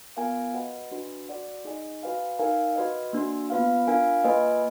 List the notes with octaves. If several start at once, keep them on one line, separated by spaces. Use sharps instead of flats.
B3 F4 A#4 F5 G#5
F#4 B4 D#5 F#5
D4 F#4 B4
F#4 D5 F#5
D#4 G#4 D#5 G#5
F#4 B4 F5 G#5
D#4 A#4 F5 G#5
F#4 B4 D#5
A#3 D4 F#4
B3 F4 B4 F5
D4 F4 A#4 F5 G#5
A#3 F4 B4 D#5 G#5